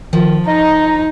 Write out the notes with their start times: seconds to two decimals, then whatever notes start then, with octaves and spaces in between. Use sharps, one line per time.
0.13 D#3 F3
0.47 D#4 D#5 A#5